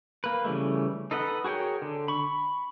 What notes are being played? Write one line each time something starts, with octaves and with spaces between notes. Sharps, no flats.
A#3 B4
C#3 E3 G3 A3
D#4 A4 B4 D#5 F#5
F#4 G#4 A#4 C#5 G5
D3
B5 C#6